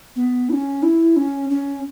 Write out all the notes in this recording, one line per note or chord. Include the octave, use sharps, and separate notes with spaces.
B3
E4
C#4
E4
C#4
C#4